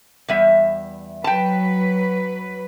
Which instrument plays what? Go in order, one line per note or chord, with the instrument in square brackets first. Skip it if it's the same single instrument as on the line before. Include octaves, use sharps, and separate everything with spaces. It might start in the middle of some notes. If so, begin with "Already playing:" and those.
[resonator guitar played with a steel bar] E2 G3 E5
[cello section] F#3 B4 [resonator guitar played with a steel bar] G5 A5